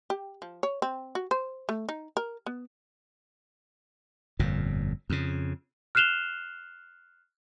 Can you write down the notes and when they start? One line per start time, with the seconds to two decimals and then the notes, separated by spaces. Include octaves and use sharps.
0.10 G4
0.42 F3
0.63 C#5
0.82 C4
1.15 F#4
1.31 C5
1.69 A3
1.89 D#4
2.17 A#4
2.47 B3
4.39 G1 F2 A#2
5.10 F2 C#3
5.95 F6 F#6 C7 E7 F7 G7